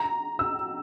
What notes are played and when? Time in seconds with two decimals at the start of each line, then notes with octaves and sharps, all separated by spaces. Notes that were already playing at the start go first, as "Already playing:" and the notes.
Already playing: A#5
0.39 E6